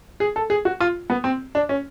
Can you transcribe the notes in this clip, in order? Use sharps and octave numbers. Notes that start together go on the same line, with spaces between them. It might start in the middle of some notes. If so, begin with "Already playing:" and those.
G#4
A4
G#4
F#4
F4
B3
C4
D4
C#4